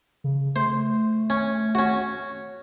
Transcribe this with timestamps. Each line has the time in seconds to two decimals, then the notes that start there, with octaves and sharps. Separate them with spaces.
0.24 C#3
0.56 A3 C5
1.30 C#4
1.75 C#4 F#4